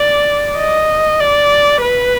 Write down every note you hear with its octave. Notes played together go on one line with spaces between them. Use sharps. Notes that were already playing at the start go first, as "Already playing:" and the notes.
Already playing: D5
D#5
D5
B4